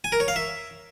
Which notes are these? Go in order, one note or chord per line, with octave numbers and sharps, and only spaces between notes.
G#5
A#4
C#5
F5
E5